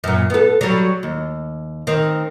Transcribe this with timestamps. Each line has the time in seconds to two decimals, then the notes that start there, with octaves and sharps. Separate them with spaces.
0.04 F#2 A#2
0.30 B3 A4
0.61 F#3 G3
1.03 D#2
1.87 D#3 C4